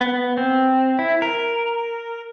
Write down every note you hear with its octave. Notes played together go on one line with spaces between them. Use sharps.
B3
C4
E4
A#4